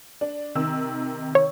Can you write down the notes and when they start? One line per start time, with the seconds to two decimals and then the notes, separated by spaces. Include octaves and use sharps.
0.21 D4
0.55 C3 D#3 E6
1.35 C#5